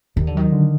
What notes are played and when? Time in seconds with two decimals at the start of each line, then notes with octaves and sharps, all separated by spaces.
0.16 D#2 D#3
0.27 D3
0.35 D#3 F#3
0.52 D3